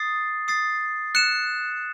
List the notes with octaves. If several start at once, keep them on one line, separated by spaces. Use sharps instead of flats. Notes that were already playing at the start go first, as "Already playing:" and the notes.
Already playing: D#6 A6 C7
D#6 A6 C7
F#6 C#7 E7